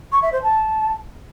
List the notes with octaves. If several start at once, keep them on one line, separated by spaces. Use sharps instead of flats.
C#6
E5
C5
A5